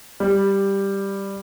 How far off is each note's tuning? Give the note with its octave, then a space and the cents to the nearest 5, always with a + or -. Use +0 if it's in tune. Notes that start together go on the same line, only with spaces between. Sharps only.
G3 +5